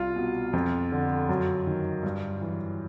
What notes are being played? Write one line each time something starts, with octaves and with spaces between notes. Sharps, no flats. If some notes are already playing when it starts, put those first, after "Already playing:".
Already playing: C2 F4
B2
F2
D3
F#2
D#3
G2
E3